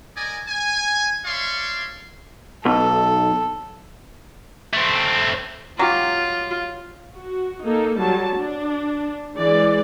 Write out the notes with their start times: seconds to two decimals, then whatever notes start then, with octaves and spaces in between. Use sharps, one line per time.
0.16 A#4 D5 D#5 G#5
0.48 G#5
1.25 C#5 D5 E5 F5 C6 C#6
2.65 B1 A4
4.73 A3 C4
5.79 F#3 F4 G4
7.15 F#4
7.63 A#3 D#4 A4
7.99 F#3 G3 A5
8.38 D4
9.36 E3 G#3 D5